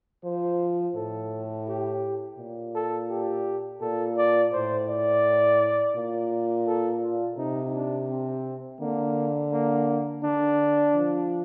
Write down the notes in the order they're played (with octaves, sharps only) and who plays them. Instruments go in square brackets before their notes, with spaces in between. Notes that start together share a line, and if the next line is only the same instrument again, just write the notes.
[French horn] F3 [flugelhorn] C5
[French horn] A2 [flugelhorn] A4
[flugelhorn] G4
[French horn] A#2
[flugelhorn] A4
G4
[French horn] A#2 [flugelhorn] A4
[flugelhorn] D5
[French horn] A2 [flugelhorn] C5
[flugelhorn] D5
[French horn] A#2
[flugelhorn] A4
F4
[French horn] C3 [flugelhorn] D#4
[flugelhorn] D4
C4
[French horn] D3 [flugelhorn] A#3
[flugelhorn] A#3
[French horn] D3 [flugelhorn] D4
[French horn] F3